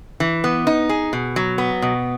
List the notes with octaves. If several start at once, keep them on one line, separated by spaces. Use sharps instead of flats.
E3
B3
D#4
G#4
B2
F#3
B3
B2